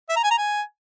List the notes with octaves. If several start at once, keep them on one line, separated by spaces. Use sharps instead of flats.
E5
A#5
G#5
A#5
G#5